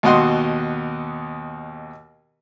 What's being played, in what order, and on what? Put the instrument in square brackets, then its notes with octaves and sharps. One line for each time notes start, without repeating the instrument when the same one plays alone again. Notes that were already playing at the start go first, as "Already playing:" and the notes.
[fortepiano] D#2 B2 D#5 F#5 C6